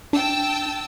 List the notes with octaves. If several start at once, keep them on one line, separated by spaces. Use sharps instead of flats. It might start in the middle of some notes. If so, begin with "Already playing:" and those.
D4 G5 A5 E6